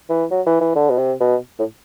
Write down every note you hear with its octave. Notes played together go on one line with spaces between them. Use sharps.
E3
F#3
E3
E3
D3
B2
C3
B2
A2